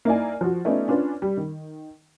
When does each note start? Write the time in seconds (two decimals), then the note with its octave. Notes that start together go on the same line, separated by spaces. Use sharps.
0.05 A#3 D#4 E4 D5 G#5
0.41 F3 F#4
0.65 A3 B3 C#4 D#4 F4 D5
0.88 C#4 D4 F4 B4
1.22 G3
1.37 D#3